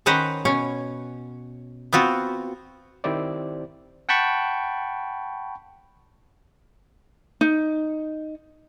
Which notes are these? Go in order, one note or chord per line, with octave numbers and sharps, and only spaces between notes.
D#3 C#4 B4 C5 F#5 A#5
B2 C#4 C#5
B3 C4 F4 F#4
D#3 C4 E4 G4 C5 D5
F#5 G5 A5 B5 C#6
D#4